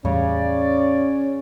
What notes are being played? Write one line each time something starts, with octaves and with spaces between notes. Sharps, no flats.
E2 A2 C#3 G3 C#4 D5